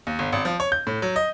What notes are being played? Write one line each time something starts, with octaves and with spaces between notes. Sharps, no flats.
D#2
G1
G#1
F3
C#5
G6
A2
F#3
D#5